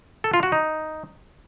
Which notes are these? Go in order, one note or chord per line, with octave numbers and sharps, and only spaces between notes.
A4
F4
F#4
D#4